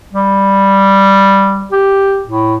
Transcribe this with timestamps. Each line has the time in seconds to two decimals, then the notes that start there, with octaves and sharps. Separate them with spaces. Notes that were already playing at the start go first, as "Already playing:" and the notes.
0.13 G3
1.72 G4
2.27 A2